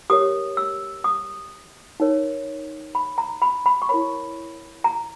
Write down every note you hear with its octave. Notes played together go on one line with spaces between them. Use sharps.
G4 A#4 C#5 D#6
E6
D#6
D#4 A#4 C#5
B5
A#5
B5
B5
C#6
E4 A#4 C#5 B5
A#5